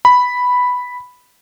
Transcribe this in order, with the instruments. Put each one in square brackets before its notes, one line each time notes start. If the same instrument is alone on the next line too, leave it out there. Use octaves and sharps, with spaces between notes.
[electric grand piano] B5